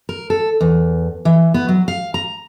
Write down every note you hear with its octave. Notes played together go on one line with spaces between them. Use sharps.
A#4
A4
E2
E3
B3
F#3
F5
A#5